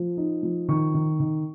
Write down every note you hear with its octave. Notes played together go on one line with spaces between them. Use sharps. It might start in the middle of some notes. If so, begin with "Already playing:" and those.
Already playing: F3
D#4
F3
D#3 C#6
D#3
D#3